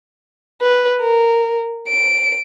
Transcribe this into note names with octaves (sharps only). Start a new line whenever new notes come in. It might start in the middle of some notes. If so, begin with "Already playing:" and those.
B4
A#4
D7